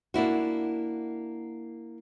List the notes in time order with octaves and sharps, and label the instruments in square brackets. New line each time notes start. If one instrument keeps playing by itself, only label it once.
[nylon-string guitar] A#3 D4 E4 F#4